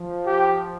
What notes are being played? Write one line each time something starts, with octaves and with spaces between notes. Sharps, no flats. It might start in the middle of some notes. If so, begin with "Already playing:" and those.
Already playing: F3
G4